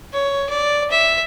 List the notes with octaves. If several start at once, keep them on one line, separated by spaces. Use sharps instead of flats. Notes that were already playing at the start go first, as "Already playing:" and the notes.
C#5
D5
E5